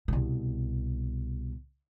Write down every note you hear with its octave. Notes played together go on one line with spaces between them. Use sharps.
C2 B2